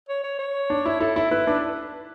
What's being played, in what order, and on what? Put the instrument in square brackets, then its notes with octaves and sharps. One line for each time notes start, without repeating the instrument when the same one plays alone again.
[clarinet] C#5
C#5
C#5
[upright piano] D4
E4
[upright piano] E4 [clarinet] A4
[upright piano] E4
[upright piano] E4 [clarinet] B4
[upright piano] D4 [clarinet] B4